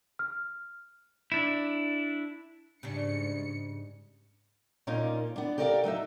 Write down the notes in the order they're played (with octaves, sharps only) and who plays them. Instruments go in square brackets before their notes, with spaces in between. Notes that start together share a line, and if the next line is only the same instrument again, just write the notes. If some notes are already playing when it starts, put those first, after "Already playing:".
[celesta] F6
[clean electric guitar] D4 E4
[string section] G#2 C#7 [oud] C#3 G3 D4
[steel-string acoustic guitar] A#2 A#3 C#4 D#4 F4
B3 D4
G4 A4 A#4 D5 D#5 F5
F#3 D#4 D#5 E5